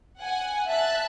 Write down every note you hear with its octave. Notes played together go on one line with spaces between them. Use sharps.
F#5 G#5
E5 A5 F#6